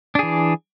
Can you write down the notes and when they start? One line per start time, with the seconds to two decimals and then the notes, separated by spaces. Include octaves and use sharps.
0.15 D4
0.19 G#4
0.23 E3